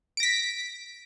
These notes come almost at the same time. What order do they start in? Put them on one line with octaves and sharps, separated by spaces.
D7 A#6 B6